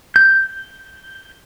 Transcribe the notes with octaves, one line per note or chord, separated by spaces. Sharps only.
G6